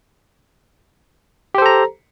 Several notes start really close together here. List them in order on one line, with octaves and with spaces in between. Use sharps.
G4 C5 A4 A#5